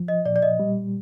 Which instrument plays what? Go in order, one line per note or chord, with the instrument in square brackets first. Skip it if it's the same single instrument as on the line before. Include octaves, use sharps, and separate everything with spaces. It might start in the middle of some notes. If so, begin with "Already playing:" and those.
Already playing: [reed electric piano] F3
[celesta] D#5
[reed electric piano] A#2 [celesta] D5
[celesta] D5
D#5
[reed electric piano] G3